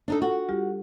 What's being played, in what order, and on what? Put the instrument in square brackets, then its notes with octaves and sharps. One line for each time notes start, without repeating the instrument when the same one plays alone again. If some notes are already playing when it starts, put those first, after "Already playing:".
[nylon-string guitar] D4 D#4 A4
[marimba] F4 A4 G5 [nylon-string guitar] F#4
[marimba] G3 F4 G4